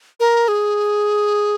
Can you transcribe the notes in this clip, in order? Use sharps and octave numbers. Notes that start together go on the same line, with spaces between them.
A#4
G#4